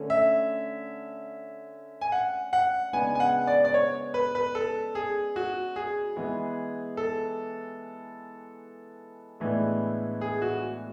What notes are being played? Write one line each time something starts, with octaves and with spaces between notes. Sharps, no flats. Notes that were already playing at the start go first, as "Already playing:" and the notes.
Already playing: D3 A3 C#4
E5
G#5
F#5
F#5
C#3 G#3 B3 D4 G#5
G#5
F#5
D5
D5
C#5
B4
B4
A4
G#4
F#4
G#4
E3 G#3 B3
A4
A2 E3 G#3 B3 D4
G#4
F#4